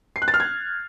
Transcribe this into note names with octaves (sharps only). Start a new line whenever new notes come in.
C7
F#6
A6
F6
G#6